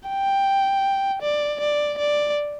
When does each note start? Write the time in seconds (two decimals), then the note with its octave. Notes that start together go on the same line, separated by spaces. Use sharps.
0.08 G5
1.22 D5
1.60 D5
1.99 D5